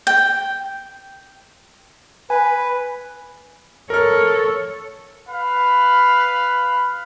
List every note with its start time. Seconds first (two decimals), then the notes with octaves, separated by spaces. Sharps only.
0.07 G5
2.30 B4 G#5
3.90 A4 A#4 C#5 F6
5.28 B4 F5 B5